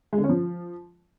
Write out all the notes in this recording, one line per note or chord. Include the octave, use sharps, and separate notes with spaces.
G#3
D3
C#4
F3